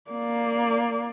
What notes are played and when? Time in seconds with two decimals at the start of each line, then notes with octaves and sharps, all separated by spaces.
0.11 A#3 D5